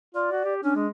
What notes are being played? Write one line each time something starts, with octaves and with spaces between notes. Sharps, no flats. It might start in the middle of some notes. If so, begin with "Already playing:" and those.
F4 D5
F#4
G4
C#4 D4
G#3